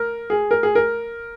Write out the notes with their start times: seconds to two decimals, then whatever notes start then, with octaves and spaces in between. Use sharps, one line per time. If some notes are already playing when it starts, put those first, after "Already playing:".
Already playing: A#4
0.30 G#4
0.51 A#4
0.63 G#4
0.75 A#4